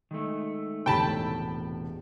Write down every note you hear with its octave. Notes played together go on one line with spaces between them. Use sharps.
D#3 G#3 A3
E1 A2 C3 G5 A5 B5